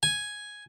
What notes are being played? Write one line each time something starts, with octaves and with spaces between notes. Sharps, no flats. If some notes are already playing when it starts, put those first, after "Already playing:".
G#5